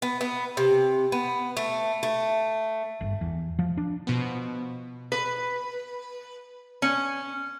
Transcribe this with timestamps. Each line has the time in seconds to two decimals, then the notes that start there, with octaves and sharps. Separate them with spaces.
0.02 B3
0.21 B3
0.57 C3
1.12 B3
1.57 A3
2.03 A3
3.01 G1
3.21 E2
3.59 F3
3.77 D4
4.07 B2 F3 B3
5.12 B4
6.82 C#4